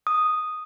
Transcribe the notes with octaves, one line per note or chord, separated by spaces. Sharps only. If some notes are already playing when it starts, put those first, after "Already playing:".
D#6